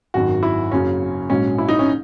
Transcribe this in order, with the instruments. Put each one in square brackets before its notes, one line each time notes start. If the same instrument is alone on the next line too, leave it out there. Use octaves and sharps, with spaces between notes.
[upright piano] G#1 F#2 D#3 F#3 F#4
E4
F#1 F#2 C#3 F#3 C#4
A#1 G#2 F#3 C#4
E4
D#4
C#4